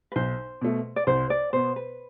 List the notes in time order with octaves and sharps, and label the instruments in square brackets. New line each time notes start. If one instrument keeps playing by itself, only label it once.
[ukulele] B4
[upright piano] B1 [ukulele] C5
[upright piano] B2 A3
[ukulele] D5
[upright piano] C2 [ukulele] C5
[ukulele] D5
[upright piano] B2 B3 [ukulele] C5
[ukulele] B4